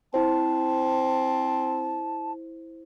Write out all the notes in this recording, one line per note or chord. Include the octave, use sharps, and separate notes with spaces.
C4 E4 C5 A5